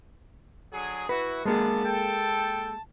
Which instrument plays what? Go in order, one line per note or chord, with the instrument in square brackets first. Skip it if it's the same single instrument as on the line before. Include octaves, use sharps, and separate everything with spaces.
[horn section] D3 F#3 G#4
[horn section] E3 E4 F#4 [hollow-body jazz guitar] B4
[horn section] D3 B3 [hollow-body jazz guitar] G#3 A#3 G#4 [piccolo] A5
[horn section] A4 G5